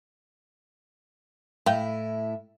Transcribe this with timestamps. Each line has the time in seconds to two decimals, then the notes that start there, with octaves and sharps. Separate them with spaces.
1.66 A2 E4 E5 F5 G5